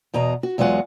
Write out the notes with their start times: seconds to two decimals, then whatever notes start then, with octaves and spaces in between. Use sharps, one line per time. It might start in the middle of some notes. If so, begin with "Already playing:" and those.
0.14 E2 B2 D#5 A#5
0.43 F#4
0.58 E2 F#3 G#3 F4 F#5 G#5